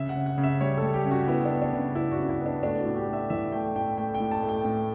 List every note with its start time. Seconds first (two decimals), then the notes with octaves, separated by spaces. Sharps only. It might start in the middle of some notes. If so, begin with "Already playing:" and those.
Already playing: C#3 E5
0.09 F#5
0.15 C#3
0.26 F#5
0.38 C#3
0.43 E5
0.61 G3 C#5
0.77 A4
0.83 G3
0.94 G4
1.05 C#3
1.11 F#4
1.28 B3 E4
1.45 B3 D4
1.62 D4
1.73 C#3
1.95 B3 E4
2.12 F#4
2.18 C#3
2.29 E4
2.40 B3
2.46 D4
2.63 A3 D4
2.79 F#4
2.85 A2
2.96 G4
3.08 A3 E5
3.30 E3 E5
3.52 A3 G5
3.76 A2 G5
3.98 A3 G5
4.15 G5
4.20 A2
4.31 A5
4.43 A3
4.49 G5
4.65 A2